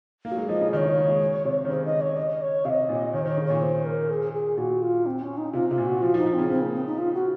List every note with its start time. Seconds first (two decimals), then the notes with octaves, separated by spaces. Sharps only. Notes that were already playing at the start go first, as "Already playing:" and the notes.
0.25 A#3
0.31 F#3
0.37 G#3
0.49 F3 D#5
0.61 C#3
0.73 D#3 C#5 D#5
0.85 C#3
0.97 A#3
1.09 G#3
1.45 C3
1.65 D#3
1.69 C#3 C5
1.85 D#5
2.01 C#5
2.17 D#5
2.42 C#5
2.65 C3 F5
2.69 D#5
2.89 A#2
3.13 D#3 C#5
3.22 C5
3.25 D#3 C#5
3.37 C#3
3.46 A#2 C#5
3.62 C5
3.85 A#4
4.10 G#4
4.33 G#4
4.57 A#2 F#4
4.82 F4
5.06 C4
5.22 C#4
5.38 D#4
5.53 C3 F4
5.70 C3 F4
5.78 A#2
5.86 F#4
6.02 F3 F4
6.14 F3
6.18 D#4
6.26 F3
6.34 C#3 C4
6.50 C#3 C4
6.62 A#3
6.74 C4
6.87 D#4
6.98 F4
7.14 F#4